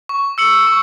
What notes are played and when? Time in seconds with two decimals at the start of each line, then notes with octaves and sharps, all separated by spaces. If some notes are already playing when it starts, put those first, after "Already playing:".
0.09 C#6
0.38 E6 C#7 F#7
0.67 C#6